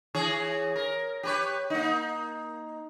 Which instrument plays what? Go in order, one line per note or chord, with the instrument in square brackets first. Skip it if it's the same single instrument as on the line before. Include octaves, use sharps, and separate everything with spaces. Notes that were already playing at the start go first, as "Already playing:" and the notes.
[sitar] E3 G#4 C#5
A#4
G4 B4 C#5
A#3 D#4